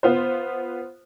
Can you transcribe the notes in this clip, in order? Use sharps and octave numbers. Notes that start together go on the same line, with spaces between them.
B3 F4 C5